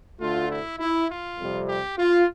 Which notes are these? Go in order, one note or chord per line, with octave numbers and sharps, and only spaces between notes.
D2 D3 A3 F4
E4
E4
F4
F2 C3 G3
G4
F4